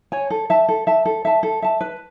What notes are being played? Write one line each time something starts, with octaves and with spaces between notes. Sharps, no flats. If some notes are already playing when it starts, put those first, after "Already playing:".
C#5 G#5
A4
E5 A5
A4
E5 A5
A4
E5 A5
A4
E5 A5
B4